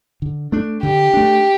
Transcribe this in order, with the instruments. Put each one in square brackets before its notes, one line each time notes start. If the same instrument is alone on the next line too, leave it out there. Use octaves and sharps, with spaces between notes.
[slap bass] D3
A3 D4
[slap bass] D3 [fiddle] G4
[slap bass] A3 D4